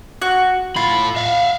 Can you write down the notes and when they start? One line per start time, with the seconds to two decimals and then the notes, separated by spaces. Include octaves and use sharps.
0.22 F#4
0.76 A2 F4 B5
1.16 E5 F5